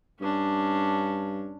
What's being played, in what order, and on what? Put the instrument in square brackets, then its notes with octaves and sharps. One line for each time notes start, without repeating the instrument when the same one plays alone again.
[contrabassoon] G2 [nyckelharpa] C#4 D4